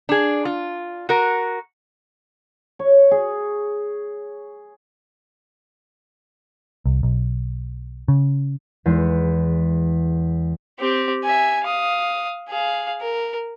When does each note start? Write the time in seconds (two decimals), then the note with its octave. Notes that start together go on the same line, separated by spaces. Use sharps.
0.09 D4 G#4
0.45 F4
1.09 F#4 A#4
2.79 C#5
3.11 G#4
6.85 C2
7.03 B1
8.08 C#3
8.86 E2 G#3
10.80 C4 G4
11.24 E5 G#5
11.64 F5 D#6
12.49 G#4 F5
13.01 A#4